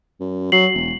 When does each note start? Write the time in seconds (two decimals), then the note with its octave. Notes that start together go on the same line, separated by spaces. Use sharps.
0.20 F#2
0.52 F#3 C7 F#7
0.74 E1